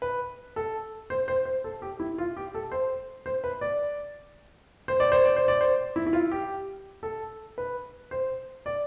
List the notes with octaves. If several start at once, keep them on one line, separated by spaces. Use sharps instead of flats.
B4
A4
C5
C5
C5
A4
G4
E4
F4
G4
A4
C5
C5
B4
D5
C5
D5
C5
D5
C5
D5
C5
E4
E4
F4
G4
A4
B4
C5
D5